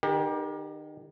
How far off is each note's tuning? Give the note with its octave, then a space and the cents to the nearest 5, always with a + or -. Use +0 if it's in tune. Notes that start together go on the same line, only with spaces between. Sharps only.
D#3 -35 G4 +25 A#4 +35